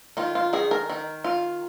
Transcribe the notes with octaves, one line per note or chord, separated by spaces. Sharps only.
D#3 F4
F4
D#3 G#4
A#4
D#3
F4